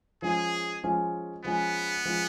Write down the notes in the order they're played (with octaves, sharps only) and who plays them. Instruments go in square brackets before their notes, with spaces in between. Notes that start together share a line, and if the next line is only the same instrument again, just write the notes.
[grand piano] F3 G#3 C#4 [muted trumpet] G#4
[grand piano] F3 G#3 C#4
[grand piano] F3 G#3 C#4 [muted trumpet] B3
[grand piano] F3 G#3 C#4